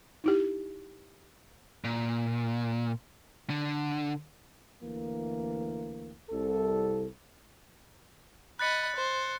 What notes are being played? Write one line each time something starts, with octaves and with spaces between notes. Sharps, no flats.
D#4 E4 G4
A#2
D3
D2 E3 A#3
C2 A4
D#5 B5 F#6 A6 C#7
C5